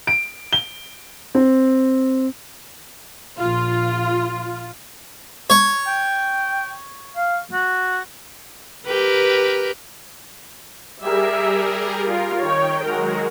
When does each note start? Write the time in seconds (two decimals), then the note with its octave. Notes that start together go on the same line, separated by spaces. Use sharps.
0.07 D7
0.53 G7
1.35 C4
3.39 A#1 F4
5.50 C#5
5.87 G5
7.16 F5
7.53 F#4
8.86 G4 A#4 B4
11.01 G3 G4 G#4 A#4 E5
11.77 G4
12.10 F4 G4 A#4
12.41 D#3 C#5 G5
12.84 F#3 G#3 F#4 A#4